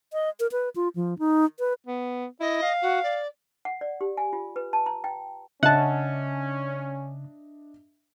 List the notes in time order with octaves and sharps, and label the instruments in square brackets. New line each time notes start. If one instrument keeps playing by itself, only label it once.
[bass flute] D#5
A#4
B4
F4
F3
D#4
B4
[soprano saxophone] B3
[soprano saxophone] E4 [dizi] D#5
[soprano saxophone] F5
[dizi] F#4
D5
[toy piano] F#5
D5
G4
G#5
F4
B4
A5
A#5
G5
[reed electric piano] C#3 [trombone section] C#4 [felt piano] D4 D#5 E5 [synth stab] F#5 A5